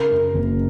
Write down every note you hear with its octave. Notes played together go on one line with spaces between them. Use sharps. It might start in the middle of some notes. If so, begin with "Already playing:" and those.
Already playing: C#3 A#4
F#2
F#1